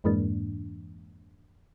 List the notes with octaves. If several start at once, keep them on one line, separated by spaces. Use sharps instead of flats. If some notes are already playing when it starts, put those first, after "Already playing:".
F2 G#2 E3 G#3 A#3 D4